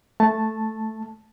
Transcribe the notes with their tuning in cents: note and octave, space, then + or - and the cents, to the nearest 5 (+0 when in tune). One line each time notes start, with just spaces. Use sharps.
A3 +0 A5 +0